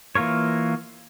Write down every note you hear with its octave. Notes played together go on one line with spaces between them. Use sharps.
E3 A#3 F4 A#4 C#5